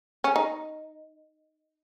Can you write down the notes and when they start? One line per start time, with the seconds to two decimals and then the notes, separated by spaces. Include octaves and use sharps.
0.24 C#4
0.36 D#4